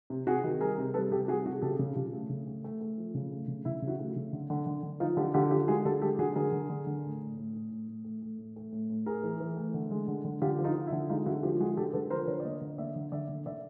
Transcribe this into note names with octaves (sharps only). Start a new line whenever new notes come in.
C3
C3 F#4 G#4
D#3
G3 G#4 A#4
C3
G3 A4 B4
C3 G4 A4
G3 F#4 G#4
C3 F#4 G#4
C#3 G4 A4
C#3
C#3 F4 G4
A3
C#3
A3
A3
A3
F3
C#3
A3
C#3
C#3 E4
C#3
E4 F#4
A3
C#3
D3
D3
D3
D3
F3 D#4 F4
D3 G4 A4
D3 F4 G4
F3 F4 G4
G#3 F#4 G#4
D3 G4 A4
G#3 G4 A4
D3 F#4 G#4
D3 G#4 A#4
D3
D3
D3
A2
A2
A2
A2
A2
A2
A3
A3
A2
A3
A2
A2
A2 G#4 A#4
E3
E3
A3
D3
G#3
D3
D3
D3 F4 G4
F3
D#4 F4
F3
E4
D3
G#3 D#4 F4
D3 E4 F#4
F3 F4 G4
G#3 F#4 G#4
D3 G4 A4
D3 A4 B4
F3 A#4 C5
D3 B4 C#5
D5
A#3 C#5 D#5
D3
A#3 D5 E5
D3
D3 D5 E5
D3
D3 D5 E5